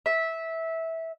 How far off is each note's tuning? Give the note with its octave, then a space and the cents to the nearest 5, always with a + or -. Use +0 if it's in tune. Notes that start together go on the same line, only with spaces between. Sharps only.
E5 -15